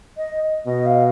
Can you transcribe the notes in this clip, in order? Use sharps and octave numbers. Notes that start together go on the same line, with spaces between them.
D#5
B2 D#5
F5